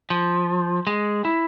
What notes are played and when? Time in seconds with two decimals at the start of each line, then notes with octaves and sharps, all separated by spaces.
0.10 F3
0.87 G#3
1.25 E4